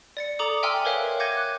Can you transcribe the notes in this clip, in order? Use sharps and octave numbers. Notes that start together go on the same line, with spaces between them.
D5 A6 C#7
A4 A#5 D6 D#6
E5 G5 G#5 C6 E6 F6
A#4 B4 C#5 E5 F5
F#5 D6 G6 G#6 A#6 D#7
F#6